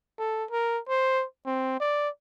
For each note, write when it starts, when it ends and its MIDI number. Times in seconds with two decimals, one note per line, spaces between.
0.19 0.45 69
0.51 0.80 70
0.89 1.24 72
1.46 1.80 60
1.81 2.09 74